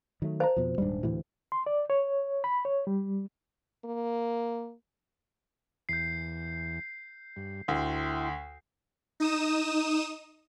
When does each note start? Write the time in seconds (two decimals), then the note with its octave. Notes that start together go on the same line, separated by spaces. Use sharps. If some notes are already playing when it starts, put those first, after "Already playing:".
0.22 D#3 F#3 A3
0.40 C5 F5 A5 A#5
0.57 F2 B2 F3
0.78 D#1 G#2 G3 D4
1.03 D2 A2 C3 E3
1.52 C6
1.66 D5
1.90 C#5
2.44 B5
2.65 C#5
2.87 G3
3.85 A#3
5.89 E2 G6 C7
7.36 G2
7.68 D2 E4 G5 C6
9.20 D#4 D#6 E7